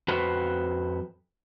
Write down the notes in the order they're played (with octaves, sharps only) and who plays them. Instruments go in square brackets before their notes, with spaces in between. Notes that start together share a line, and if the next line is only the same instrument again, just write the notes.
[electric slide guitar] F2 F#4 B4 C5